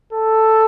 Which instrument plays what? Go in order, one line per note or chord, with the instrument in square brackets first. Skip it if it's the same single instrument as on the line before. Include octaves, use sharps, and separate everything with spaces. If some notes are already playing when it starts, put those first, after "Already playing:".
[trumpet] A4